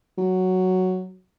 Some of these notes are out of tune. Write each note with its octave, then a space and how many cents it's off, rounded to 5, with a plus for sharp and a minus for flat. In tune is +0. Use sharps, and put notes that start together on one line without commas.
F#3 +0